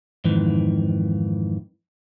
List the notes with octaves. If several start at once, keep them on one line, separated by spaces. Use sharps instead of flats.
F2 G#2 D#3 E3